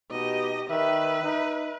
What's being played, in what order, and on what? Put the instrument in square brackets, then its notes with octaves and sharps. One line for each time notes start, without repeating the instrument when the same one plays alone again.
[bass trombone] B2 [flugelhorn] D#4 [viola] G4 D#5
[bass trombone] D#3 [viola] B4 [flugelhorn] E5
[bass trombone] D#4 [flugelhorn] E5